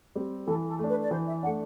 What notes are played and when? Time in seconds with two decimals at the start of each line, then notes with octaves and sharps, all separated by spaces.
0.15 G3 C4
0.47 E3 A4
0.68 A4
0.79 A3 D4
0.90 B4
1.02 D5
1.11 E3 C5
1.28 E5
1.43 A3 D4 F#5